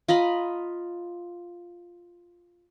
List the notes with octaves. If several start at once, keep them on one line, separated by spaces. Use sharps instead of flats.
F4 D#5 A#5 B5